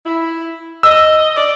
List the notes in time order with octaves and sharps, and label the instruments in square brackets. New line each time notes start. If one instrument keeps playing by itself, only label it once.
[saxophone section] E4
[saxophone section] D#5 [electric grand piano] E6
[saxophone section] D5